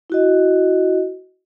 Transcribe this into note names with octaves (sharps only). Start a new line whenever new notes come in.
E4 F#4 D#5